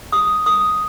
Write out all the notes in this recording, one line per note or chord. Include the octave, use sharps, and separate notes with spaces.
G4 D#6
A#4 D#6